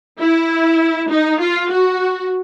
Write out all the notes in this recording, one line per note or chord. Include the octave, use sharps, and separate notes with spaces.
E4
D#4
F4
F#4